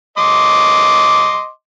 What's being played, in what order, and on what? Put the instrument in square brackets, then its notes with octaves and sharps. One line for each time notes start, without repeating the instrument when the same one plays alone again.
[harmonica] D#5 C6 D6